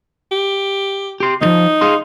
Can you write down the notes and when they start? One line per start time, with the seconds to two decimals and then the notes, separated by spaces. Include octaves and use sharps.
0.31 G4
1.20 G4 C6
1.41 D2 F3 D#4
1.81 G#4 F5 C6